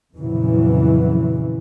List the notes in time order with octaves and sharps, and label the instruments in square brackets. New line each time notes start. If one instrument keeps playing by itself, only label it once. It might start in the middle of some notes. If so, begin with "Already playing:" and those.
[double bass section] F2 A#2 C#3 E3 F#3